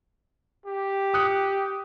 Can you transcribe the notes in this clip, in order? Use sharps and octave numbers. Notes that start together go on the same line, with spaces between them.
G4
D#6 F#6 C#7